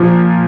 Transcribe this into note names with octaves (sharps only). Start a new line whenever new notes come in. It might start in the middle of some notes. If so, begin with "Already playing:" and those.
Already playing: A#2 F3